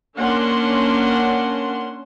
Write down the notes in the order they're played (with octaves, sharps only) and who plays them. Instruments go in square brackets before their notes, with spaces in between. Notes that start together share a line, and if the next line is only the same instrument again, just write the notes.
[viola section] A#3 C#4 D4 F#5 C6